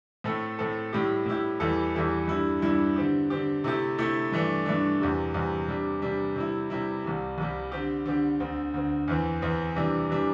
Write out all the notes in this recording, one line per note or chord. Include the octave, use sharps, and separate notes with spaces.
A2 A3 C4 A4
A2 A3 C4 A4
A2 G3 E4 G4
A2 G3 E4 G4
E2 E3 G3 E4 A4
E2 E3 G3 E4 A4
G2 G3 E4
G2 G3 E4
D3 C4 G4
D3 C4 G4
C3 A3 E4 G4
C3 A3 E4 G4
G2 E3 A3 D4
G2 E3 A3 D4
E2 C3 G3
E2 C3 G3
C3 G3 D4
C3 G3 D4
C3 G3 E4
C3 G3 E4
C2 C3 G3
C2 C3 G3
D3 C4 G4
D3 C4 G4
D2 D3 C4
D2 D3 C4
E2 E3 C4
E2 E3 C4
C3 E3 G3 D4
C3 E3 G3 D4